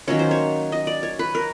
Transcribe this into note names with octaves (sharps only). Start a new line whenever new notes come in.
D#3 F#3 A#3 C#4 C#5
C5
C#5
D#5
D5
C#5
B4
A#4